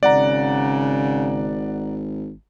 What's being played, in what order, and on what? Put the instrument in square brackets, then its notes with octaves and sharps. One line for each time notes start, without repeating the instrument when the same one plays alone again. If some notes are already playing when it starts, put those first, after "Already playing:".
[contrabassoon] G#1 [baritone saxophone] C#3 [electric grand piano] D5 F#5 A#5